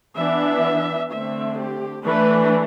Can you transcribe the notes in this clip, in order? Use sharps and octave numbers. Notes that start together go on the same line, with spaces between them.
E3 B3 D4 E5
D3 A3 C4 E5
G4
E3 A3 D4 B4